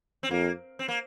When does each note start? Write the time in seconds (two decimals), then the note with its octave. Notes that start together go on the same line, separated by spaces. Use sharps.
0.23 C4
0.30 F2 A#3
0.79 C4
0.88 A#3